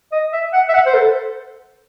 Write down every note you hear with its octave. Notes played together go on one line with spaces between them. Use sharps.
D#5
E5
F#5
E5
F#5
C5
A4